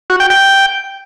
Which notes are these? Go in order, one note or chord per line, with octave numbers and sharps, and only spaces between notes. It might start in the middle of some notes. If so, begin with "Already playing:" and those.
F#4
G5
G5